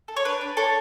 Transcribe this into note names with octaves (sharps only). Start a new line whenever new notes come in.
A4
C#5
D4 B4
D4
D4 A4 C#5